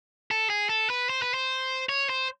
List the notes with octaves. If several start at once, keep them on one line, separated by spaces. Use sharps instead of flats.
A4
G#4
A4
B4
C5
B4
C5
C#5
C5